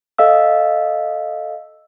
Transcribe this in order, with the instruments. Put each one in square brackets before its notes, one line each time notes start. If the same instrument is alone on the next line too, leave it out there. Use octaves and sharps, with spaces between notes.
[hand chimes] A4 D#5 F5 E6